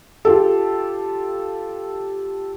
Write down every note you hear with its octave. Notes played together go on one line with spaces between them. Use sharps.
F4 G4 A4